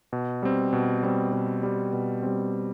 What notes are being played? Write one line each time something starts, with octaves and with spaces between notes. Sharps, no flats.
B2
G3 C4
B2
G3 C4
B2
G3 C4
B2
G3 C4